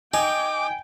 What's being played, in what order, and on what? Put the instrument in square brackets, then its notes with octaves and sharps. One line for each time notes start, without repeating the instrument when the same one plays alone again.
[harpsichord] D#4 [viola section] G5 [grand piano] G#5 [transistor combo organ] D6